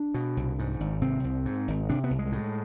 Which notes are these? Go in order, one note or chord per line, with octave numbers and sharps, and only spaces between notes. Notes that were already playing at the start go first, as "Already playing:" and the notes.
Already playing: D4
B2
C2
G#2
G#1
C3 C4
C2
G#2
G#1
C3 D4
B3
C2
G#3
A2